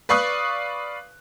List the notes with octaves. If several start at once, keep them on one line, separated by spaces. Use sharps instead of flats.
B4 D5 F5 C#6 D#6 F#6